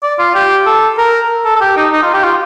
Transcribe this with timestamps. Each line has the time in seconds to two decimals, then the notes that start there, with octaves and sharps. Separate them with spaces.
0.03 D5
0.19 F4
0.35 G4
0.66 A4
0.97 A#4
1.45 A4
1.56 A4
1.61 G4
1.76 D#4
1.92 D#4
2.03 F4
2.13 G4
2.23 F4